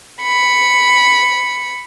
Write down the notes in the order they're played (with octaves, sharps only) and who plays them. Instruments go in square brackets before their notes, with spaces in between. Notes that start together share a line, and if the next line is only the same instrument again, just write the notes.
[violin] B5 C#7